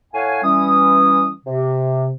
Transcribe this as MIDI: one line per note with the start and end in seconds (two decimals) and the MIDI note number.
0.14 0.43 45
0.14 0.43 73
0.14 0.43 77
0.14 0.43 78
0.14 0.43 80
0.44 1.32 52
0.44 1.32 55
0.44 1.32 61
0.44 1.32 87
1.46 2.12 48